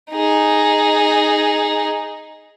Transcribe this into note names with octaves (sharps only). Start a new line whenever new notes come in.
D#4 G#4